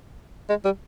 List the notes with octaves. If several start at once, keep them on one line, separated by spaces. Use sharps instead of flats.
G#3
G3